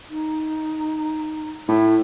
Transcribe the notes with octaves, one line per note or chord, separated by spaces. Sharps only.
D#4
A2 E4